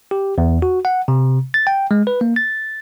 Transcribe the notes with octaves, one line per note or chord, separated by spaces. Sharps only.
G4
E2
F#4
F#5
C3
A6
G5
G#3
B4
A#3
A6